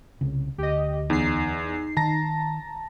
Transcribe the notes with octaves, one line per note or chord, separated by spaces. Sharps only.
C2 C#3
D2 G4 D#5
E2 D#4 C7
D#3 A5 A#5 A#6